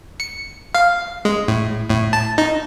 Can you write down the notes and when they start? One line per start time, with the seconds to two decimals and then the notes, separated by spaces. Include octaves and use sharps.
0.20 C#7
0.74 F5
1.25 G#3
1.48 A2
1.90 A2
2.13 A5
2.38 D#4